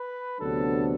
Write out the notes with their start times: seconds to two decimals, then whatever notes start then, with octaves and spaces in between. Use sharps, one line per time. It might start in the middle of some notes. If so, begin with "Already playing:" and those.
Already playing: B4
0.40 D2 C3 F#3 B3 D4 A4